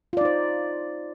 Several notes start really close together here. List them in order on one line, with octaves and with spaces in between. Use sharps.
F4 D5 D#4 C5